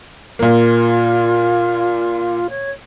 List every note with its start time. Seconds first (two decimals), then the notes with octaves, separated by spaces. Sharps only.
0.39 A#2 A#3 F4
2.49 C#5